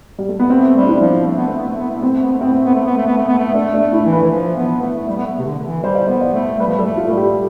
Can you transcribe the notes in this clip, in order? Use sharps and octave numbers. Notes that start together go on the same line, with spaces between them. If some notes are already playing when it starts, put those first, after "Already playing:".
G3
A3
B3
A3 C4
G3
D4
E4
F3
A3
B3
A3
B3
A3
B3
A3
B3 C4
A3
B3
A3
B3 C4
A3
B3
A3
B3
A3
B3
A3
B3
A3
A3 D4
D4
A3
E4
E3
B4
E3
F3
B3
A3
A3
G3
B3
A3
C3
D3
D3
E3
G3 C5
D5
B3 C5
D5
A3
G3 B4
F3
G3 A4
A3
F4
G3 A4
G4